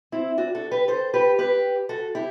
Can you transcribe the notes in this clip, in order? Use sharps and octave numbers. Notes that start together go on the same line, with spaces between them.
C4 E4
D4 F#4
F#4 A4
G4 B4
A4 C5
G4 B4
G4 B4
F#4 A4
E4 G4